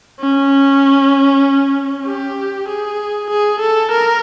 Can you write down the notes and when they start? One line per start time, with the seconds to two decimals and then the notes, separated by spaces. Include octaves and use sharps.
0.20 C#4
2.05 G4
2.68 G#4
3.30 G#4
3.60 A4
3.91 A#4